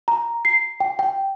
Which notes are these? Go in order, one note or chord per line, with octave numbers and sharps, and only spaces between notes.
A#5
C7
G5
G5